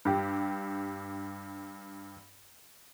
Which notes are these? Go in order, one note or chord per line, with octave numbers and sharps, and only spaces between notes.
G2 G4